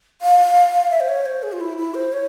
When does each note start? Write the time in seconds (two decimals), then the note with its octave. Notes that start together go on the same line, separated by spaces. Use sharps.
0.21 F5
0.90 E5
1.00 C5
1.09 C#5
1.26 C5
1.43 G#4
1.52 F4
1.60 E4
1.77 E4
1.94 C5
2.13 C#5